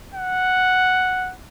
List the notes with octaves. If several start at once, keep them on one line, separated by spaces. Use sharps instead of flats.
F#5